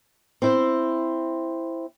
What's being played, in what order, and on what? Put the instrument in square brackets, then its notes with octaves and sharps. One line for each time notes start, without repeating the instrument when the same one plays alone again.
[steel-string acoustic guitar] C4 E4 C5